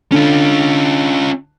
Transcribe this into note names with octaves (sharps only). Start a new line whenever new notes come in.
D3 C#4 F4